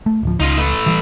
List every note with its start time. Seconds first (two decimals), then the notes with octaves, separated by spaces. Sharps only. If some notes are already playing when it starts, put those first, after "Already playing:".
0.06 A3
0.23 D1 F3
0.40 C#2 D#4 F4
0.57 A3 B4
0.86 E3 G3